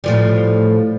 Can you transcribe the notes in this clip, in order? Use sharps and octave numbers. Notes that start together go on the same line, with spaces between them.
A2 F3 G3